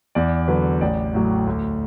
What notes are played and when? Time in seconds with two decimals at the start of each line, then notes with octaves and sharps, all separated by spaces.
0.15 E2 D5
0.48 D3 F#3 B4
0.81 A1 D5
1.14 A2 F#3
1.47 D2